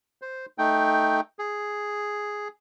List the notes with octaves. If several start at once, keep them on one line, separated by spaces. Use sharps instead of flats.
C5
A3 D#4 G5
G#4